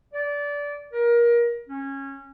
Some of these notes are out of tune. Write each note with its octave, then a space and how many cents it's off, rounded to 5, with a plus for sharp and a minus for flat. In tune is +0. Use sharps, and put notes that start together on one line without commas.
D5 -20
A#4 +25
C#4 -20